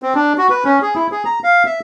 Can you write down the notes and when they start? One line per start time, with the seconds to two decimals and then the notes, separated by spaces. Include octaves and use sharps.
0.03 C4
0.15 D4
0.38 F#4
0.50 B4
0.64 C#4
0.82 G#4
0.95 E4
1.12 G#4
1.25 A#5
1.44 F5
1.66 E5